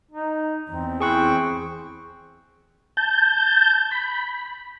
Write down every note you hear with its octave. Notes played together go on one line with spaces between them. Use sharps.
D#4
E2 C4
C4 E4 G#4 C5 G5 C#6 F#6
A5 G6
B5